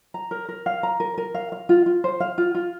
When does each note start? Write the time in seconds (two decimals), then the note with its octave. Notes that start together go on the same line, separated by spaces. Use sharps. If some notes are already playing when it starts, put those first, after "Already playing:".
0.14 A#5
0.31 A#4
0.49 A#4
0.66 F5
0.83 A#5
1.00 A#4
1.18 A#4
1.35 F5
1.52 F5
1.69 F4
1.86 F4
2.04 C5
2.20 F5
2.38 F4
2.55 F4